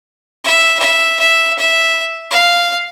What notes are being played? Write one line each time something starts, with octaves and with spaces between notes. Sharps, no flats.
E5
E5
E5
E5
F5